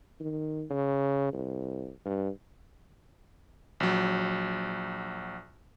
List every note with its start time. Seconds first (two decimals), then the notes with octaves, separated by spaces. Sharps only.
0.20 D#3
0.70 C#3
1.33 C2
2.05 G2
3.80 A#1 F#3